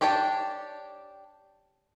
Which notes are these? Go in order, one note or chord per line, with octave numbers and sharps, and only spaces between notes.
D4 G4 C#5 G5 A5